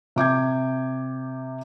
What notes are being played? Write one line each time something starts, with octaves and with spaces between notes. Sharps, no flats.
C3 D6 G6 G#6